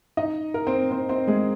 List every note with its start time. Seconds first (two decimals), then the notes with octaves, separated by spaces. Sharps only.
0.17 D#4 D#5
0.54 A#4
0.67 C4 C5
0.91 C4 C5
1.09 C4 C5
1.27 G#3 G#4